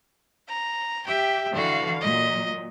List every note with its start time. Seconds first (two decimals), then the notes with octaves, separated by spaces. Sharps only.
0.49 A#5
1.06 G4 E5 G5
1.54 D3 E3 F#4 F5
2.01 A#2 F#3 D#5